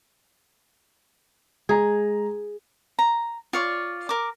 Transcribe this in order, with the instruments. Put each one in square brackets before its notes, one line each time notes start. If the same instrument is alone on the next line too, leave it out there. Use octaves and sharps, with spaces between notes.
[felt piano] G#3 A#5 [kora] G#4
[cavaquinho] A#5
F4 C#5 D5
A#4 D6